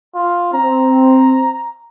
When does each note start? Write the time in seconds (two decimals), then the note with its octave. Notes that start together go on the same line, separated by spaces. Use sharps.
0.15 F4
0.54 C4 A#5